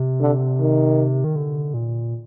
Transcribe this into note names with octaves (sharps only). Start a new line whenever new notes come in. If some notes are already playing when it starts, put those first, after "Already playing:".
Already playing: C3
D3
D#3
D#3
D3
A#2